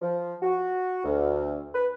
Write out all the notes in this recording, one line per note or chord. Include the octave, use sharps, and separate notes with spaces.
F3
F#4
D2
B4